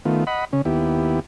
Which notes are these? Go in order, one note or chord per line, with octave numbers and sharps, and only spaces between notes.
D#3 A3 B3 F4
D#5 F#5 B5
C#3 C#4
D#2 B3 E4 G4